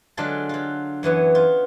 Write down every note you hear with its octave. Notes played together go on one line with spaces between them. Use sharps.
D3 F#3 G#3 D4 F4 A4
F#3 F4
F#2 E3 B3 C#5
F4